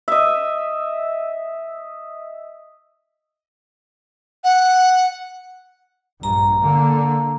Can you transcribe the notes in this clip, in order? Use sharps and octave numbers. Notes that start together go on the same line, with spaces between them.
D#5 E5
F#5
A#1 G2 A#5
D3 A#3